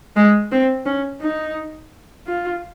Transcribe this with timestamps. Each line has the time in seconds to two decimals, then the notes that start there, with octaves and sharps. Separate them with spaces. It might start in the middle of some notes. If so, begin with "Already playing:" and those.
0.16 G#3
0.52 C4
0.86 C#4
1.21 D#4
2.27 F4